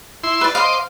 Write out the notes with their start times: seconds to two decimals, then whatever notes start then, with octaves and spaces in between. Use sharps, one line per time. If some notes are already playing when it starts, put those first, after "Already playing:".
0.24 E4 C6
0.41 B4 D5
0.55 C5 D#5 F5 C6 D6